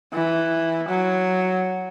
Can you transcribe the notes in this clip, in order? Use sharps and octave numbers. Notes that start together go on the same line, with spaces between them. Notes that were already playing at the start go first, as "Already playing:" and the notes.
E3
F#3